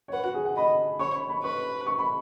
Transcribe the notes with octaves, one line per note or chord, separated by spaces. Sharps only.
C#5
B4 F#5
F#4
G#4
F#5
D#5 B5
C#5 C#6
B5
B5
B4 C#6
C#6
B5